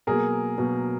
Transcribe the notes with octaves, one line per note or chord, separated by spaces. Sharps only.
B2 F#3 A#3 G#4 A#4
B2 F#3 A#3